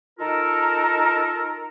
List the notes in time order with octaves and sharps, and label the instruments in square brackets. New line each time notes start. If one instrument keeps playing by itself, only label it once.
[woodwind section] D#4 F4 A4 A#4